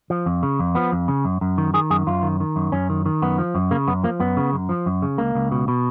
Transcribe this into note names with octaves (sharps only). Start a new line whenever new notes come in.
F3
F2
C#3
F2
F3 B3
F2
C#3
F#2
F#2
D#3
D#3 G#4
F#2 G#4
F#2 F4
D#3
D#3
F#2
F#2 C#4
D#3
D#3
F#2 B3
F3
F#2
C#3 A#3
F#2 B3
F3 A#3
F#2 B3
C#3
F#2
F3
F#2
C#3
C#2 A#3
C#2
B2
B2